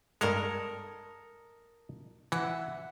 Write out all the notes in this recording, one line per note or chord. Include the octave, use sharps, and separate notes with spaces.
G2 G#3 A4 A#4 D#5
E3 E5 F#5